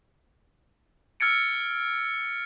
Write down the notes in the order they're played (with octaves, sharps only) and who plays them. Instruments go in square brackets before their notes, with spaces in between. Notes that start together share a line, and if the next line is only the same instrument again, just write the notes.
[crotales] E6 F6 G#6 A6 C#7 D7